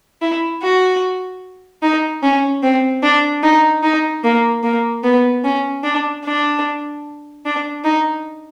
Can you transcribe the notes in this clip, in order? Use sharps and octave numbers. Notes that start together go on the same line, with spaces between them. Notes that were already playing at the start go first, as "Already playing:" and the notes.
E4
F#4
D#4
C#4
C4
D4
D#4
D#4
A#3
A#3
B3
C#4
D4
D4
D4
D#4